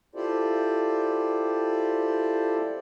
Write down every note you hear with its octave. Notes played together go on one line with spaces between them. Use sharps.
E4 F4 G4 A4 C5 D5